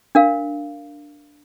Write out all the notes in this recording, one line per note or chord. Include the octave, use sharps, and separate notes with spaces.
D4 A#4 F5